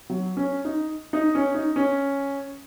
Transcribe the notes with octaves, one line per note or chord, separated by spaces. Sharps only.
F#3
C#4
D#4
D#4
C#4
D#4
C#4